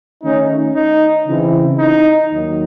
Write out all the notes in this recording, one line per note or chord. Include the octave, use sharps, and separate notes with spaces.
D#3 A3 C#4 D#4
D#4
C#3 E3 C4 E4
D#4
D#2 D#3 F#3